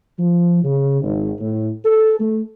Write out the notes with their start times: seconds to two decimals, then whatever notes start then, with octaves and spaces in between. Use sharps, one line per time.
0.19 F3
0.63 C#3
1.02 G#1
1.40 A2
1.85 A4
2.20 A3